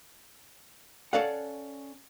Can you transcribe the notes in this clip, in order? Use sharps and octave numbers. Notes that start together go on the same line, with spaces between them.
C#4 A4 D5 F5 F#5